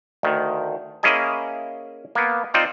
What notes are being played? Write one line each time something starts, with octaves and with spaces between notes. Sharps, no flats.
D2 D#3
A#3 C#4 E4 G#4 D#5 G#5
A#3 B3
C4 D#4 F4 C5 D5